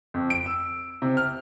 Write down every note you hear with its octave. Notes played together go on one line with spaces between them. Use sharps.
F2
D7
E6
C3
F6